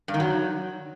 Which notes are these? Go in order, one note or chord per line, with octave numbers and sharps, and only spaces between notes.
G2
D#3
F#3